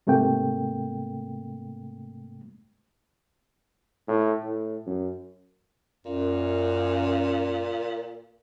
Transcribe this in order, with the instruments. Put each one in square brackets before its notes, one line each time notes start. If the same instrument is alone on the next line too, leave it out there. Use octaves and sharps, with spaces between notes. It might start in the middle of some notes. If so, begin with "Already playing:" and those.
[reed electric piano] G#2 C3 A3 A#3 G5
[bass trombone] A2
A2
F#2
[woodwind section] F#2 [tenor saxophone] A#2